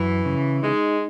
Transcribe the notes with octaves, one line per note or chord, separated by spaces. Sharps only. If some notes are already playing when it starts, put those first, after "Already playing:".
Already playing: F#2 E3
C#3
G#3 D#4